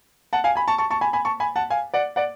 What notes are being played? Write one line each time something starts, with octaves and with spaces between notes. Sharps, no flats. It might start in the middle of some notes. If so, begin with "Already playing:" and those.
F#5 A5
F5 G#5
G#5 B5
A5 C#6
A5 C#6
A5 C#6
G#5 B5
G#5 B5
A5 C#6
G#5 B5
F#5 A5
F5 G#5
D5 F#5
D5 F#5